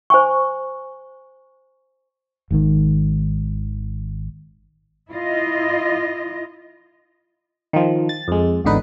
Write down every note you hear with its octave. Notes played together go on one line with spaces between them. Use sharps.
C5 G#5 C#6
G#1 G#2 D3 D#3
E4 F4 D#5
D#3 F3
A6
F2 G#3
G#1 E2 D3 D#4 B4